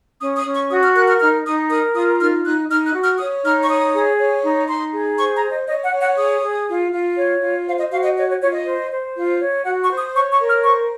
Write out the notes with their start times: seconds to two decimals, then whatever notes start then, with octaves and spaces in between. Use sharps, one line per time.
0.21 C#4 D#6
0.38 D#6
0.46 C#4
0.54 C#6
0.70 F#4 D#6
0.83 F6
0.95 A#4 F#6
1.07 F6
1.20 D#4 F6
1.45 D#4 D#6
1.69 A#4 D#6
1.95 F4 D#6
2.19 D#4 F6
2.44 D#4 F#6
2.69 D#4 F6
2.86 F#6
2.94 F#4
3.03 F6
3.18 C#5 D#6
3.44 D#4 F6
3.63 C#6
3.69 C#5 D#6
3.94 G#4
4.18 C#5
4.43 D#4
4.68 D#4 C6
4.93 G#4
5.18 C5 C#6
5.34 A#5
5.43 C5
5.51 D#5
5.67 C#5 D#5
5.84 F#5
5.92 C#5
6.01 F#5
6.17 G#4 D#6
6.42 G#4
6.67 F4
6.92 F4
7.17 C#5
7.41 F4
7.66 C5 F5
7.79 D#5
7.91 F#4 F5
8.04 D#5
8.16 C#5 D#5
8.28 C#5
8.41 F4 C#5
8.53 D#5
8.66 C5
8.91 C5
9.16 F4
9.40 C#5
9.65 F#4 F#5
9.82 C#6
9.90 C5
9.99 D#6
10.15 C#5 C#6
10.31 C#6
10.40 A#4
10.48 F6
10.65 C5 C#6